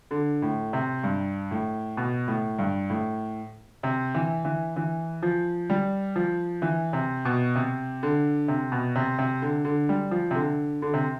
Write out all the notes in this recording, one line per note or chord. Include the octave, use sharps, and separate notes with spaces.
D3
A2
C3
G2
A2
B2
A2
G2
A2
C3
E3
E3
E3
F3
G3
F3
E3
C3
B2
C3
D3
C3
B2
C3
C3
D3
D3
G3
F3
C3
D3
D3
C3